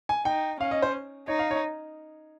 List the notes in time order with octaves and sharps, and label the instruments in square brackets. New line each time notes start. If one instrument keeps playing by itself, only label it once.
[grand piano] G#5
[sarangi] D#4 [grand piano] G5
[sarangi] C#4 [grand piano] F5
[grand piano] D#5
C5
[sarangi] D#4 [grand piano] C#5
[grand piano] F5
C#5